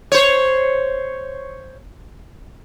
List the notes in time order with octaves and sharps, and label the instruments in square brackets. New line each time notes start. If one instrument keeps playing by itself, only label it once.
[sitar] C5 C#5